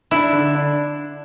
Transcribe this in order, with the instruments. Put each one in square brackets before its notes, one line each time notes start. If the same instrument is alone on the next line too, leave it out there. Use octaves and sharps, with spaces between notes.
[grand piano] D4 [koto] E4
[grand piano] D3
D4